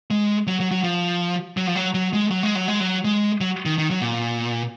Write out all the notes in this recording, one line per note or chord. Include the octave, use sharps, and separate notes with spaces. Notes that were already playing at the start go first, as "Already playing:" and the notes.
G#3
F#3
F#3
F#3
F3
F#3
F3
F#3
F#3
G#3
F#3
G#3
F#3
G#3
F#3
G#3
F#3
D#3
D#3
F#3
A#2